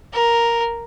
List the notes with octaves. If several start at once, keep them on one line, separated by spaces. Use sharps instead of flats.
A#4